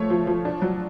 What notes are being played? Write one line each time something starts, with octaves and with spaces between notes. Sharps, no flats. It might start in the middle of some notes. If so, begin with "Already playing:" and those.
Already playing: F3 A3 C#5
F3
F3
D4
F#3